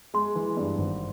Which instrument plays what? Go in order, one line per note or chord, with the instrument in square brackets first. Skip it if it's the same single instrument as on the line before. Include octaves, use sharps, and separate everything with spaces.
[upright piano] G#3 [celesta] C6
[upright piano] E3
G2
G#1